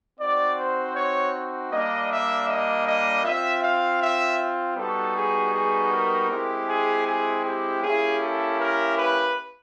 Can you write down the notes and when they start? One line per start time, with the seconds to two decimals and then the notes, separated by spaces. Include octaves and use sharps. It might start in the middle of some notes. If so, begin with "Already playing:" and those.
0.19 C4 D#4 F#4 D5
0.57 C5
0.95 C#5
1.71 G3 A#3 D4 D#5
2.09 E5
2.48 D#5
2.86 D#5
3.24 C4 F4 E5
3.62 F5
4.00 E5
4.76 G3 B3 D#4 F#4 A4
5.14 G#4
5.53 G#4
5.91 A#4
6.29 G#3 C4 E4 G4
6.67 G#4
7.06 G#4
7.43 G4
7.81 A#3 C#4 E4 G4 G#4
8.20 A4
8.58 A#4
8.97 B4